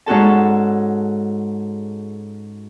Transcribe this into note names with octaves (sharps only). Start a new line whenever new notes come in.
G#2 C#4 F#4 A4 A5